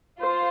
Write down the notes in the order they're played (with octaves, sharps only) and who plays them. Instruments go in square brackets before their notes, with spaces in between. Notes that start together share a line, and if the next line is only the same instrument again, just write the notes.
[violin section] F4 [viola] C5